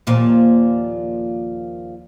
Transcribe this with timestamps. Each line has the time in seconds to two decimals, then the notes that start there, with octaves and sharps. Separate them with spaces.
0.07 D#2 A#2 F3